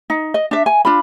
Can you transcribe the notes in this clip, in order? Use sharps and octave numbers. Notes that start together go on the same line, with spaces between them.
D#4
D#5
D4 E5
G#5
D4 F4 B5